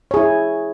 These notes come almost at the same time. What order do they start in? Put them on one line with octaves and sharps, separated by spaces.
C#5 G#4 E4